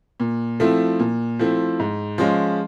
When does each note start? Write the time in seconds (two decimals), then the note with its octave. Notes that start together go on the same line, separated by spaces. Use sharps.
0.20 A#2
0.60 F3 A3 C4 E4
1.00 A#2
1.39 F3 A3 C4 E4
1.80 G#2
2.18 F3 G#3 C#4 F4